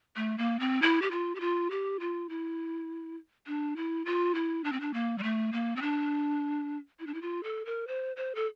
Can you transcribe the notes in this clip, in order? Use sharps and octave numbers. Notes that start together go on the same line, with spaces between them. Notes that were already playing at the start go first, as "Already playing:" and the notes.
A3
A#3
C4
E4
G4
F4
G4
F4
G4
F4
E4
D4
E4
F4
E4
D4
C4
D4
A#3
G3
A3
A#3
C4
D4
E4
D4
E4
F4
A4
A#4
C5
C5
A4